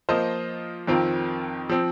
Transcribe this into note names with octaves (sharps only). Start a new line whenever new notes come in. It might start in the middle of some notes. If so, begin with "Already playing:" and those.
F3 A#3 F4 C5 D#5
F2 D#3 C4 F4 A#4
F3 C4